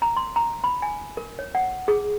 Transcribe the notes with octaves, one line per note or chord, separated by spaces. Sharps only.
A#5
C6
A#5
B5
G#5
A#4
C#5
F#5
G#4